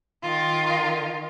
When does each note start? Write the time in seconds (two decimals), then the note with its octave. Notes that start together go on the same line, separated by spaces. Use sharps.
0.22 D#3 F4